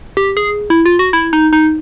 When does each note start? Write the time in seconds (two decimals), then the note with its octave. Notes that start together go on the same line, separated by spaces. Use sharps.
0.17 G4
0.37 G#4
0.70 E4
0.85 F4
0.99 F#4
1.13 E4
1.33 D#4
1.53 D#4